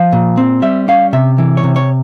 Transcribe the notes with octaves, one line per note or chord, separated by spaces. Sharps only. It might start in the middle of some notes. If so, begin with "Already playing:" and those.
Already playing: F3 F5
A#2
C4
G3 E5
C#4 F5
C3 E5
E3
C#5
C3
C#5